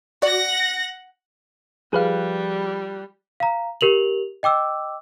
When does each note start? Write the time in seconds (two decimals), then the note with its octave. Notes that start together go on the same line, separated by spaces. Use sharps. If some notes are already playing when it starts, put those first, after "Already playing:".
0.22 F#4 D5 F#5 A#6
1.93 F3 G3 G#4 B4 F5 F#6
3.40 F5 A#5
3.81 G4 A#4 F7 F#7
4.43 D#5 G5 D6 E6